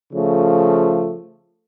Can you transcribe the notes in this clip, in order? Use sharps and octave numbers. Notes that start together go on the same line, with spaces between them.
C#3 F3 A3